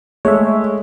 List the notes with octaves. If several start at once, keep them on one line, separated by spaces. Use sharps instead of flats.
G#3 A3 C#5 E5